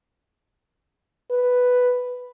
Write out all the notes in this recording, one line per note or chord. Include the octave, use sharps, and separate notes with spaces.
B4